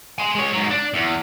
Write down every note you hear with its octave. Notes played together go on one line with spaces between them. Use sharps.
G#5 C6
G#3 C#5
G#2 F#3
D4
E2